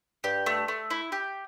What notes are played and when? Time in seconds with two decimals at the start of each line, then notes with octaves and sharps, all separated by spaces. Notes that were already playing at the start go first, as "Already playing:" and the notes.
0.24 G2 G4
0.46 A3
0.68 A3
0.90 E4
1.12 G4